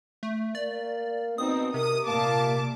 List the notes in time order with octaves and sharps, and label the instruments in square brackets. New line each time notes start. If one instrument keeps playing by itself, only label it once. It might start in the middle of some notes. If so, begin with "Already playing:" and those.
[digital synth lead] A3
[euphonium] A#3 [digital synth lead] D5
[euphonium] B2 [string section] C4 D#4 [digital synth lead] D#6
[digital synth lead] C3 [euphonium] A#4 [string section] D#6
[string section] A#2 A5 D6 [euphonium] A#3